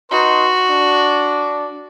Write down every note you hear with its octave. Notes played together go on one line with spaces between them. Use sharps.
D#4 F#4 B4 C6
D4